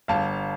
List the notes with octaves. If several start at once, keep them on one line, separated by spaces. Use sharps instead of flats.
G1 F5 A5